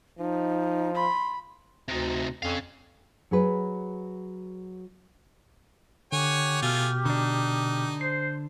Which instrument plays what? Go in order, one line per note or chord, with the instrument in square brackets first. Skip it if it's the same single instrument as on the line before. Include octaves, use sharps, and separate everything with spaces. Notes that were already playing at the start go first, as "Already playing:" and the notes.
[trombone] F3 [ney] D#4
[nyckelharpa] B5 [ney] C6
[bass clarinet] D2 [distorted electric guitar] C3 D#4
[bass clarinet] F2 [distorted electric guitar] C#4 F5
[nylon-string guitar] F#3 G#4 B4
[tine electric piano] D3 [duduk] G4 [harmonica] C#5 F#5 G#5
[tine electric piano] B2 F6 [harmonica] A3 F4 G#5
[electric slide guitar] D3 D4 [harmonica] D#4
[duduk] C5 [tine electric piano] C7